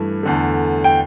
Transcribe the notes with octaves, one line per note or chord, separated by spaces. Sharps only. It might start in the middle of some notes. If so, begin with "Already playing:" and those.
Already playing: G2 E3 A3
E2 D3 A3
G5